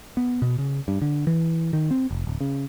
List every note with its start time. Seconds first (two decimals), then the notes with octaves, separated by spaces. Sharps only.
0.17 B3
0.42 B2
0.58 C#3
0.88 G2
1.02 D3
1.27 E3
1.73 D#3
1.91 C4
2.11 F1
2.27 D1
2.41 C#3